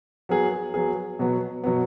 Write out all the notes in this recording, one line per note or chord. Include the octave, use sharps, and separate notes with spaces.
F#3 B3 G#4
F#3 B3 G#4
B2 F#3 B3
B2 F#3 B3